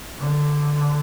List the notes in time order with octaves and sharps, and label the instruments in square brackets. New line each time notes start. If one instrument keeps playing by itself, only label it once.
[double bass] D3